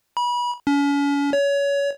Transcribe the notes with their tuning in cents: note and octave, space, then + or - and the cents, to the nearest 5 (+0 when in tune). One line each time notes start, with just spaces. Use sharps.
B5 -30
C#4 +40
C#5 +25